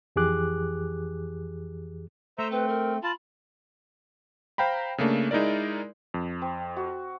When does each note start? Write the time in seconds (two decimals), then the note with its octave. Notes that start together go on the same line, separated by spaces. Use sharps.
0.16 F2 E3 G4 G#4 D6 F#6
2.39 A3 C5 E5 A#5
2.52 C4 B4
2.69 A#4
3.03 F4 A5 B5
4.58 C5 F5 G5 A#5 B5
4.98 C#3 A3 A#3 D4
5.31 G#3 D#4 E4 A#4 D5
6.14 F2
6.42 C4
6.76 F#4